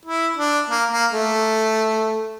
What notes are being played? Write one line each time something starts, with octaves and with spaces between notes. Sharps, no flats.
E4
D4
A#3
A#3
A3